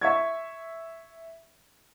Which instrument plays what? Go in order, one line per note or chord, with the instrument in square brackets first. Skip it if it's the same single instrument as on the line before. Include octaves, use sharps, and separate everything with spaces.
[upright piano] E5 C#6 G#6